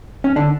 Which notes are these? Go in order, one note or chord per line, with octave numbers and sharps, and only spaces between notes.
C#4
D3 D4